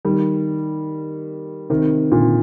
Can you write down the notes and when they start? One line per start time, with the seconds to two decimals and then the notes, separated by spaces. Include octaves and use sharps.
0.05 D#3 G3
1.70 C3 D#3
2.12 A#2 D3